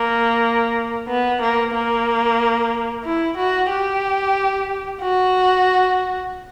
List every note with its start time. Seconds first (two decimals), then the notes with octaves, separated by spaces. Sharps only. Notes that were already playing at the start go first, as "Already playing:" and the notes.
Already playing: A#3
1.08 B3
1.41 A#3
1.74 A#3
3.05 E4
3.37 F#4
3.70 G4
5.01 F#4